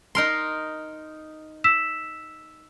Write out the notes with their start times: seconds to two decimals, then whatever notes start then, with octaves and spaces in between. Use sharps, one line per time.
0.15 D#4 A#4 C6
1.64 E6 B6 E7